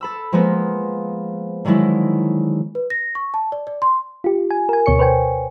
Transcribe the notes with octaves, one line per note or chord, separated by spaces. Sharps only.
A4 B5 E6
F3 G#3 A#3 B3
D3 D#3 F#3 G#3 E4
B4
A#6
C#6
A5
D5
D5
C6
F4 G4
G#5
A#4 G#5
D2 B2 C#5 C#6 C#7
B4 C5 G5 G#5